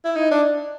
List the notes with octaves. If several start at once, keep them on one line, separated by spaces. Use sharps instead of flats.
E4
D#4
D4